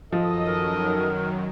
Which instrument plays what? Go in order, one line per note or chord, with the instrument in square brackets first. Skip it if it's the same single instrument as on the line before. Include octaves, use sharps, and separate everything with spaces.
[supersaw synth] F#2 D#3 F#3 [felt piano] F3 [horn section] A4 D#5
[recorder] A#4